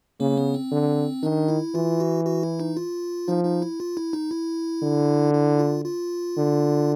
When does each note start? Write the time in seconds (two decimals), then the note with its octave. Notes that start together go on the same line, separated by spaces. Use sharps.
0.20 C#3 A#3
0.37 B3
0.54 C4
0.71 D3
1.23 D#3 D4
1.48 E4
1.75 E3 F4
2.00 F#4
2.25 F#4
2.43 E4
2.60 D#4
2.77 F4
3.28 F3 D#4
3.45 D#4
3.62 E4
3.80 F4
3.97 E4
4.13 D#4
4.31 E4
4.82 D3
5.34 E4
5.59 F4
5.85 F4
6.37 D3